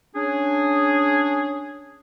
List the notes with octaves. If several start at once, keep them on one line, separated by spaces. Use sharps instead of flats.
C#4 D4 G#4